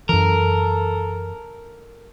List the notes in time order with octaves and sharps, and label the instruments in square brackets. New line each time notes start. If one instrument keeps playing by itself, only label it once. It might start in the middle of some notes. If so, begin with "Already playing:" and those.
[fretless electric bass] F#2 E3 [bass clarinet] A4 [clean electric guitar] A#4